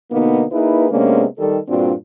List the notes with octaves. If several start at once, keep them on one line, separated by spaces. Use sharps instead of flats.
B2 D3 A#3 B3 D#4
A#3 D#4 E4 G#4 B4
C3 G#3 A#3 B3 C#4 D4
D#3 G3 A4
G2 A#2 C4 D4 F4 F#4